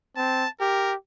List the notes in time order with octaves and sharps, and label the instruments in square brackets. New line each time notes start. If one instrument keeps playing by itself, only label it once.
[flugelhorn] C4 [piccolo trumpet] A5
[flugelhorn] G4 [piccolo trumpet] A#4